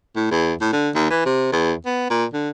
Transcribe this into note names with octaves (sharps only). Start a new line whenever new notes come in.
A2
E2
A2
D3
D#2
E3
C3
E2
B3
A#2
D3